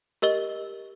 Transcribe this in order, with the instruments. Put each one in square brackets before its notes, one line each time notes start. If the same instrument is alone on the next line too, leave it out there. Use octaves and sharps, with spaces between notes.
[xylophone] G4 A#4 D#5 G7